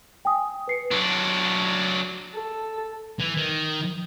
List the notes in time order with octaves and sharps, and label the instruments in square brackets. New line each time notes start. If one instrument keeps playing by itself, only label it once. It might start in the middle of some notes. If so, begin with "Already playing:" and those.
[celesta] G5 G#5 D#6
B4 C7 C#7
[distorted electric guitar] F#3 D4
[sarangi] A4
[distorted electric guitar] E3
D#3